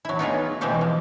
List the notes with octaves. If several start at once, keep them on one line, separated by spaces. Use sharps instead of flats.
F#3 E4
B3 D#4 F4 G#4
B2 E3 G#3 C4 G4 F5
F3